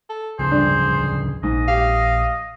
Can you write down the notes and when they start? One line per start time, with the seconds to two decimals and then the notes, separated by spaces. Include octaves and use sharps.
0.10 A4
0.39 D1 C#3 F3 G#4 C5
0.51 G2 D4
1.43 A#1 G#2 D#5
1.68 G4 F5